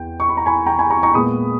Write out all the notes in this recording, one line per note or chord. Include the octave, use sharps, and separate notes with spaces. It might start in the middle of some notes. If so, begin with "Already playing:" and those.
Already playing: E2 G5
C#6
B5
A#5
G#5 B5
G5 A#5
G#5 B5
A#5 C#6
A#5 C#6
A#2 G#3 B3 B5 D#6